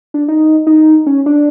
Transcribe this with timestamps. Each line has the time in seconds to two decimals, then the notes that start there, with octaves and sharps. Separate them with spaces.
0.14 D4
0.28 D#4
0.67 D#4
1.06 C#4
1.26 D4